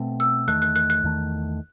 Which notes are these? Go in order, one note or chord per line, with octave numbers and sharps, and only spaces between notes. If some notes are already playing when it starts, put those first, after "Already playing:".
Already playing: B2 A3 C4
E6
E2 D#3 A3 F#6
F#6
F#6
F#6
E2 D#3 A3